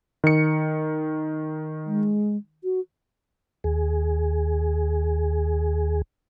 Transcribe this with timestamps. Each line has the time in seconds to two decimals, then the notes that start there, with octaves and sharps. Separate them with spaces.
0.24 D#3 C#7
1.86 G#3
2.64 F#4
3.64 D#2 G#4